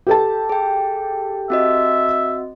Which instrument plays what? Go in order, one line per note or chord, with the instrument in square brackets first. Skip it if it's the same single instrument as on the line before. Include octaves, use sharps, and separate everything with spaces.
[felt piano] G4 A4 A5
[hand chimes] G#4 G5
[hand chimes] C4 F#4 D#5 [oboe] E5